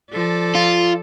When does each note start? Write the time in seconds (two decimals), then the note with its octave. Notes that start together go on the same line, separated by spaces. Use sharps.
0.12 F3 A4 D5
0.55 F4